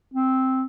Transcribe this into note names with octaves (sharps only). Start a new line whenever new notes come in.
C4